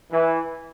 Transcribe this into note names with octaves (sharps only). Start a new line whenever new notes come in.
E3